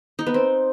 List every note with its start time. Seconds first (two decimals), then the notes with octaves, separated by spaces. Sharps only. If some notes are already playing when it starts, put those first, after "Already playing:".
0.19 D#4
0.26 B3
0.34 C4